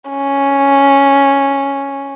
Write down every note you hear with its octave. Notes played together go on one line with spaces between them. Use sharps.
C#4